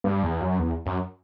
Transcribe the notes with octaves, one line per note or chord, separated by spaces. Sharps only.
G2
E2
F#2
E2
F#2